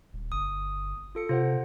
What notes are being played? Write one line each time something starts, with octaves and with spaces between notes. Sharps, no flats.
D#1
G1 D#6
F4 A4 C#7
C3 F4 C5 F#5